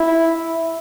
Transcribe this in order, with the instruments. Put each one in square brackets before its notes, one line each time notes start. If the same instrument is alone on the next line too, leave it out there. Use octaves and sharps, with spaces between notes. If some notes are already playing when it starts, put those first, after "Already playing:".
Already playing: [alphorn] E4